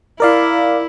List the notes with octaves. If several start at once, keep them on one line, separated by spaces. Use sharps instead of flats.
E4 A#4 D5 F5